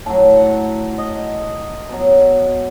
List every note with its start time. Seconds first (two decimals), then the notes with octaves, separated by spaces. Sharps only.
0.06 A2 F#3 A5
0.36 F#5
0.98 D#5
1.89 B2 F#3